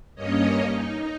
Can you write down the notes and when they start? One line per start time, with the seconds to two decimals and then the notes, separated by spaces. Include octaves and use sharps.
0.16 G2 A#3 C#4 C#5 D#5
0.65 D#4